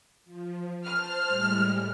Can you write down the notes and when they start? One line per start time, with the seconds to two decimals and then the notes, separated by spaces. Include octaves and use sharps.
0.25 F3
0.84 C5 A5 F6
1.24 A2 G3 G#3